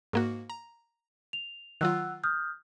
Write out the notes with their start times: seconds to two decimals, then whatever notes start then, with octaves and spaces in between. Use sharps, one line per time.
0.13 G#2 A#3 F#4
0.50 A#5
1.33 F7
1.81 D#3 F#3 F4 F#5 E6 F#6
2.24 D#6 F6 G6